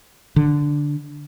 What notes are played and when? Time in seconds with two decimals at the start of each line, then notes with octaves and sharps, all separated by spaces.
0.36 D3